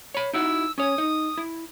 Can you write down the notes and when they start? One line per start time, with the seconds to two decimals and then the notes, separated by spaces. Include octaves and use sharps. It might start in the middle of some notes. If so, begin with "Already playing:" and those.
0.14 C#5 B5
0.33 D#4 E4 F#4 E6
0.78 C#4 C#5 D#6
0.98 D#4
1.38 E4